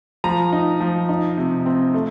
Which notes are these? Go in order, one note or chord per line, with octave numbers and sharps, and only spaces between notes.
F3 A#5
D#4
F3
D#4
C3
C4
A3